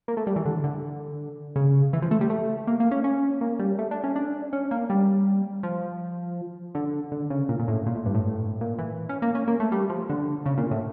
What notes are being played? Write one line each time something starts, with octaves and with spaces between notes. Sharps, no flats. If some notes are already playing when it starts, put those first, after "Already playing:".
A#3
A3
G3
E3
D3
D3
C#3
E3
F3
A3
G3
A3
A#3
A#3
C#4
C#4
A#3
G3
A3
D4
C#4
D4
C#4
A#3
G3
F3
D3
D3
C#3
A#2
A#2
A2
A#2
A2
G2
A2
A#2
E3
C#4
A#3
C#4
A#3
A3
G3
F3
D3
C#3
A#2
A2